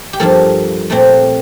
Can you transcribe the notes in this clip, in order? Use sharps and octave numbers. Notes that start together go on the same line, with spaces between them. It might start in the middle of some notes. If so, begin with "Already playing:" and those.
G4
G2 F3 A#3 A4
A#2 A3 C4